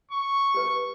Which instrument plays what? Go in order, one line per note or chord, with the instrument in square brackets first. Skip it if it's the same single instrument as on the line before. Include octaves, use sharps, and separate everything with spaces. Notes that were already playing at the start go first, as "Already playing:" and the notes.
[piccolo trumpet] C#6
[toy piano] G4 B4